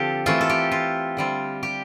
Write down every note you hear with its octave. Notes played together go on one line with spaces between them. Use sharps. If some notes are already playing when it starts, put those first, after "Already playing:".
Already playing: D3 F3 C4 F4 G4 A4
E3 A3 C4 F4
A4
G4
F4
D3 G3 C4 F4
G4